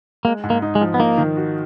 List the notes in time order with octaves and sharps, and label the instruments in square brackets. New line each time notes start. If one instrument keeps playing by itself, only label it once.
[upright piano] G#3 [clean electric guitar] A#3
[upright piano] G#2
[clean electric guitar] A#3
[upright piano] D#4
[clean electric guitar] G#3
[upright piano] F3
[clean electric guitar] B3
[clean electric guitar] A#3 [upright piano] D#4
[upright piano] D#3
F#4